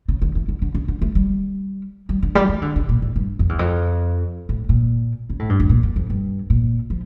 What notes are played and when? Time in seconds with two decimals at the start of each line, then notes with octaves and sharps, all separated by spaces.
0.08 C#3
0.22 D3
0.35 E3
0.48 D3
0.62 D3
0.75 C#3
0.88 D3
1.02 A3
1.15 G3
2.09 G3
2.22 D3
2.35 G3
2.49 E3
2.62 D3
2.76 C#3
2.89 A#2
3.02 A2
3.16 G2
3.39 F2
3.49 E2
3.59 F2
4.49 A2
4.69 A#2
5.30 C#3
5.39 A2
5.49 G2
5.60 F2
5.69 A#2
5.83 E2
5.96 F2
6.10 G2
6.50 A#2
6.90 F3